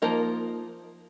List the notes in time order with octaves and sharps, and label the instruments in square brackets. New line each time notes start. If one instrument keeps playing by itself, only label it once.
[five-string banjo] F3 A#3 D#4 A#4